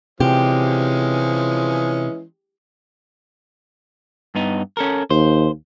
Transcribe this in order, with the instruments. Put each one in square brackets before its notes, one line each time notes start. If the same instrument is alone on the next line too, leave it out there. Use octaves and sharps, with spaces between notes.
[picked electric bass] C3 [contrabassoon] E3 [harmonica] F3 G#3 C#4 [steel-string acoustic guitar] G4
[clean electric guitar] G2 B3 D#4
C#4 A4 A#4
[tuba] D#2 [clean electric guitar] C5